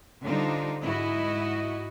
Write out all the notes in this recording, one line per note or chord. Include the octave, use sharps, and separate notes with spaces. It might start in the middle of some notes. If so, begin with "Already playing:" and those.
D3 G3 D4 D#4 F4 C5
G#2 E4 F#4 D#5